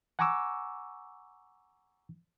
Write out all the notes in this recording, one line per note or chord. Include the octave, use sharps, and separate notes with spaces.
F#5 G#5 A#5 C#6 D6 E6